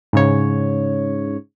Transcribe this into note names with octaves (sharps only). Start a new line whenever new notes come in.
G#2 C#3 C#5